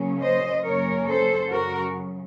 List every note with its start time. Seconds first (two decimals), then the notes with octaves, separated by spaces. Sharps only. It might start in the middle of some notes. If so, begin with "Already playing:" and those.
Already playing: C#3 F#3 A#3 C#4
0.22 C5 D#5
0.65 F#2 C#3 F#3 A#3 C#4 A#4 C#5
1.07 A4 C5
1.50 F#2 C#3 F#3 F#4 A#4